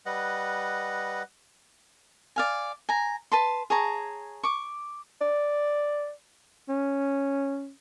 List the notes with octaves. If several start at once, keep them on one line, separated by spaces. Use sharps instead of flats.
G3 B4 D#5 F#5
D5 F5 G#5
G#5 A#5
B4 A5 C6
G#4 C#5 A5 A#5
C#6 D6
D5
C#4